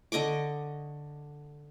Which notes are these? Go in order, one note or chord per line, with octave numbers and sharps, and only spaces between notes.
D3 D#5 C#6 D6